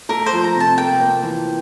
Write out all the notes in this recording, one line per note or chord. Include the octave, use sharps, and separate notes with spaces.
A3 A#4
C5
F3
A#5
C3 A5
A#3 G5
A#3
E3